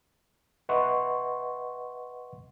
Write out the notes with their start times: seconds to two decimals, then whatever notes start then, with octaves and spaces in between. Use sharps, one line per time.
0.69 B4 D#5 E5 F#5 C6 C#6